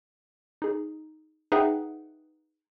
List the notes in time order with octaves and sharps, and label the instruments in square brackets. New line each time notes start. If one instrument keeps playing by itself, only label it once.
[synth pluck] D#4 G#4
D#4 G#4 B4 E5 F#5 G5